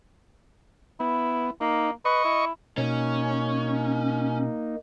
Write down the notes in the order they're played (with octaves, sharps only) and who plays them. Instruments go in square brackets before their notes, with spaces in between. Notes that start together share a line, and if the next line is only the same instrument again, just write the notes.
[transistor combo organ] B3 [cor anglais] E4
[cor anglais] A#3 [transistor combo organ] D#4
[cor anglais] B4 [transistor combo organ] D#5 C#6
[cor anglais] E4
[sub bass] B2 [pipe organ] A#3 D#4 [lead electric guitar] C#4